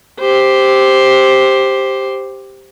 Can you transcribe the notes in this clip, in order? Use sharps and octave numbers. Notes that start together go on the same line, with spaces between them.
G4 C5